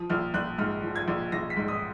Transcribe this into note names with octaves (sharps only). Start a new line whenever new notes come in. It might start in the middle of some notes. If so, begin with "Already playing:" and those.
Already playing: F3 D#6
A#1 F6
A#1 F#6
G#2 F6
F3
G#6
A#1
A#1 A#6
B6
G#2
D#6